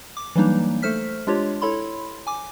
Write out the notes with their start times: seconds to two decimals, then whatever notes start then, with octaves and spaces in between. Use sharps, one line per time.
0.17 D6
0.36 E3 F#3 G3 A#3 D4 D#4
0.82 A3 A4 C5 F6 B6
1.27 G#3 D4 F4 G4 C#5
1.62 E4 A4 C#5 B5 C6
2.27 G#5 D6